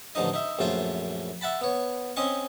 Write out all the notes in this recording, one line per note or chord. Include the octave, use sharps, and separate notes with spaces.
A1 D3 F3 D#4 D#5
D#4 E5
A#1 F#2 A3 F4 C5
E5 F#5 A5 B5
B3 C#5
C4 C#4 D#5 C6 C#6